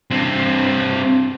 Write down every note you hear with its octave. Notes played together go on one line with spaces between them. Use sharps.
G2 C4